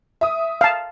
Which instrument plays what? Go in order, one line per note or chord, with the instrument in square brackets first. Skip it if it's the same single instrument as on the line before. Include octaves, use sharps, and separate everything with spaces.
[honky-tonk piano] E5 D#6
[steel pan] F5 A5